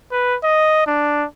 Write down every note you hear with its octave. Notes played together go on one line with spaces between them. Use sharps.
B4
D#5
D4